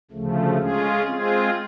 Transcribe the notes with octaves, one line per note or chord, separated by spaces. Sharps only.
D2 C#3 F3 A3
G#3 C#4 F4 G#4
G#3 C4 F4 G#4